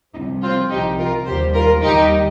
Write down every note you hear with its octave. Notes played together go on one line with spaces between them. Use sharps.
C2 C3 F3 D#4
C4 F4
C2 C3 F3 D#4 G4
F4 A#4
D#2 D#3 G3 G4 C5
F4 A#4
D#2 D#3 G3 D#4 G4